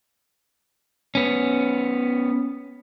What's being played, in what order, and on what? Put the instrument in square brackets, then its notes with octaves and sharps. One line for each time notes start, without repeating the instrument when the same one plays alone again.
[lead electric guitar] B3 C#4